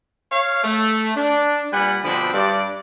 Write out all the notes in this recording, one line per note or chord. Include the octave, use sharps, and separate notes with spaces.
C#5 F5
A3
D4
A#2 G3 B4 F#5 G#5 B5
B2 D3 F3 C4 D4 B5
G2 D5